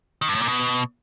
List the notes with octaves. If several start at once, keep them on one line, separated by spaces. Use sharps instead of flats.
D#3
G2
A2
A#2
B2